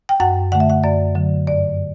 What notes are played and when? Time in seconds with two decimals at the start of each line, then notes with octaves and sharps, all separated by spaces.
0.09 G5
0.20 F#2 F#5
0.52 D3 A3 F#5
0.60 E5
0.70 F#5
0.84 F#2 D5
1.15 D3 F#3
1.47 G2 D5